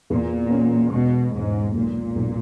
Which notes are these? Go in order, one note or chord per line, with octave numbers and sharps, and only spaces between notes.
E2 A#2
C#4
E1 B2
E1 G#2
B1 A#2
B1